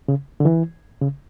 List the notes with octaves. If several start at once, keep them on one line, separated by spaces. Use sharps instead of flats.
C#3
D3
E3
C#3